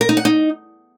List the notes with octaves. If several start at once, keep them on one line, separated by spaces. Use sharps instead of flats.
A#4
D#4
F#5
D#4